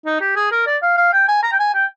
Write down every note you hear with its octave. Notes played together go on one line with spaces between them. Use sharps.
D#4
G4
G#4
A#4
D5
F5
F5
G5
G#5
A#5
G5
G#5
G5